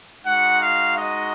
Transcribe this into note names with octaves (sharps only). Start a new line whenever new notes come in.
G#3 D#4 F#4 F#5
F5
D#5